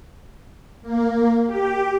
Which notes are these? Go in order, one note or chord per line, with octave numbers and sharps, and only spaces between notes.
A#3
G4